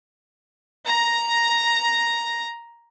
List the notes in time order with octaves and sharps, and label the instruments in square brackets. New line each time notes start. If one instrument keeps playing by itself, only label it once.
[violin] A#5 A#6